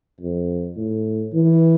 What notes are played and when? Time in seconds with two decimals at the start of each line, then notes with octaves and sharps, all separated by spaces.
0.21 F2
0.77 A2
1.33 E3